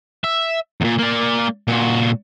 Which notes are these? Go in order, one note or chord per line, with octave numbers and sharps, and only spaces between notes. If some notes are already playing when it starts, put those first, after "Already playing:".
E5
E2 A#2
A#3 D5
A#2 F#4